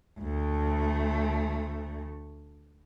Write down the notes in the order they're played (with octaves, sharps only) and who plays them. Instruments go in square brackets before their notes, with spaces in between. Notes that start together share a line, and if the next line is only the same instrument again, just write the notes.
[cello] D2 A3